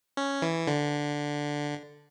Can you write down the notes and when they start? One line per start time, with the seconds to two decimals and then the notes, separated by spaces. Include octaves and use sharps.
0.17 C#4
0.42 E3
0.67 D3